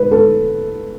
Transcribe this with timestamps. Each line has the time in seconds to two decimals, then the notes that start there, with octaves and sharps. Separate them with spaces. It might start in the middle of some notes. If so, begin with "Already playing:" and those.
Already playing: B4
0.11 A4